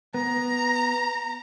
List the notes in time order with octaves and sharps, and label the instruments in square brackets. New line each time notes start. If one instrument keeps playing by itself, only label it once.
[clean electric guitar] B3 [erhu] A#5